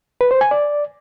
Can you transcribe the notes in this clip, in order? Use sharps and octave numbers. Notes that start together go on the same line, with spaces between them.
B4
C5
G#5
D5